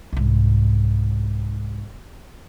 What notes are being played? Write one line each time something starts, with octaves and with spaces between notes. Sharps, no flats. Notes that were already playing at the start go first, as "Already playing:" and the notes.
C2 G#2